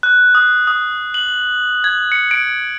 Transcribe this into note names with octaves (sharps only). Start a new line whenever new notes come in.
F#6
D#6
D#6
F#7
G#6
C#7
D7